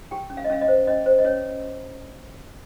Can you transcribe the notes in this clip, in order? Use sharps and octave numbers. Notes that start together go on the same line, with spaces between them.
G4 G5
C#4
F5
D#5
C#4 F5
D#5
C5
C#4 D#5
C5
D#5
C#4 C#5